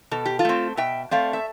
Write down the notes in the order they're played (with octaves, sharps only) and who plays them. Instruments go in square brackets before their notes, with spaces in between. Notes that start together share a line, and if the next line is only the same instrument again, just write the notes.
[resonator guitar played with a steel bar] B2 A4
G4
F4 A4
A3 C4
B2 E5 G5
A3 C4 D5 F5
E5